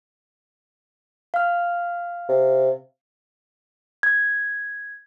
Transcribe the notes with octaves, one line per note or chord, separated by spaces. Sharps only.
F5 F6
C3
G#6